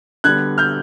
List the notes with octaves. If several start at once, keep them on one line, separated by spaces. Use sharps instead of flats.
D3 G3 B3 F#6 G#6
F6 G6